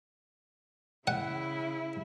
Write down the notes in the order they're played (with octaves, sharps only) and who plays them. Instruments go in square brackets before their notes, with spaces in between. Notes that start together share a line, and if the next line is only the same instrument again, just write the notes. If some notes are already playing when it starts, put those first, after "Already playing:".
[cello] C#3 E4 [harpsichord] F#5